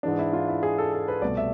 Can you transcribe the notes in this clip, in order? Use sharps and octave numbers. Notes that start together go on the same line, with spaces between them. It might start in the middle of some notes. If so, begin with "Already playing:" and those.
G#2 E3 G#3 D4
E4
F4
E4
G#4
A4
A4
B4
C2 B2 A3 D5
E5